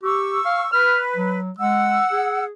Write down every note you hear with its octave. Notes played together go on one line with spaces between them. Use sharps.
G4 C#6 E6
F5
B4 F6
F#3
G#3 F#5 E6
G#4